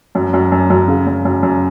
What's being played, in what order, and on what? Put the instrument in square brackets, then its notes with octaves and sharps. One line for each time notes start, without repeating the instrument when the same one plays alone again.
[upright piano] F#2
F#2
F#2
F#2
C#3
F#2
F#2
F#2